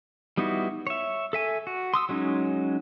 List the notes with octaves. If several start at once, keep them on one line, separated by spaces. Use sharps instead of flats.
G3 B3 D#4 E4 F#4
C#5 E5
A4 E5 G#5
F#4
C6 D#6 E6
F#3 G#3 C#4 D#4